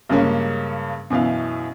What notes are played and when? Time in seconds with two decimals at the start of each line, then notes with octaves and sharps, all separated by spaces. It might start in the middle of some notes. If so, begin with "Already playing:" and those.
0.10 G2 C#3 G#3 A#3 C#4
1.10 F#2 B2 E3 F5